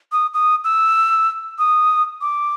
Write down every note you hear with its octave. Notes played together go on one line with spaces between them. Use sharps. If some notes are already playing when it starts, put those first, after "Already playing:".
D#6
D#6
E6
D#6
D6